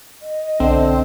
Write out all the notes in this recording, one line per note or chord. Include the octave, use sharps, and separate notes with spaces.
D#5
B1 D3 C4